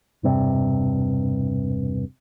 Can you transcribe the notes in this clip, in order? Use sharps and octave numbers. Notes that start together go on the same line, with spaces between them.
E1 G2 C3